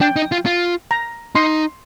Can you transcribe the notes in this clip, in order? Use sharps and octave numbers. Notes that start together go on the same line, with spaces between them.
D4 G5
D#4
F4
F4
A#5
D#4 C6